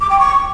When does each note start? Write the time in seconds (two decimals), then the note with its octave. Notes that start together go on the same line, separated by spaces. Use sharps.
0.01 D6
0.10 G5
0.19 C#6